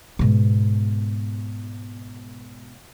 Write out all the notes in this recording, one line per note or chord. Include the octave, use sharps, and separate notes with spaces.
G#2 B2